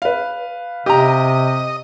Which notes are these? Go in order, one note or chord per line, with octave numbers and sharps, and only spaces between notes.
B4 F5
C3 G4 D#5 A#5